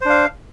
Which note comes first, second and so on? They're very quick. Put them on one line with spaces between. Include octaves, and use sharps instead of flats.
C5 D4 F5